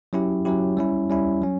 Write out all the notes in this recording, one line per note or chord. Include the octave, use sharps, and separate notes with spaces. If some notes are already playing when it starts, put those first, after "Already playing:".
F#3 C#4 E4 G4
F#3 C#4 E4 G4
G3 C#4 E4
G3 C#4 E4
F#3 C#4